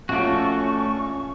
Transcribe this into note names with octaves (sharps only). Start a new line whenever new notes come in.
A#1 A3 C#4 F4 F#4 C#6 D7